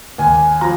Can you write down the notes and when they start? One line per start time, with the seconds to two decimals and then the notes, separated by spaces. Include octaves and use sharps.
0.18 D#2 G#5
0.61 F3 A#5